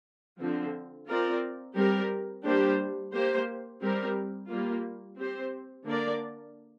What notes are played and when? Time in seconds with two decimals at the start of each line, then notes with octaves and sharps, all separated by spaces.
0.40 D3 F3 C4
1.08 C4 F4 A#4 D5
1.76 G3 C4 G4 A#4
2.44 G3 A#3 D4 G4 C5
3.13 A#3 G4 C5
3.81 G3 C4 G4 A#4
4.48 G3 A#3 F4
5.17 C4 G4 C5
5.84 D3 A#3 D4 A#4 D5